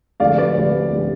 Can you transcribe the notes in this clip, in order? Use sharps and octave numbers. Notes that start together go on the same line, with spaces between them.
D2 C3 F3 D5 F5
B4 D5
D2 C3 F3
D2 C3 F3